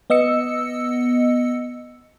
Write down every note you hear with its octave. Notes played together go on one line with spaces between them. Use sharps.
B3 D#5 E6 C#7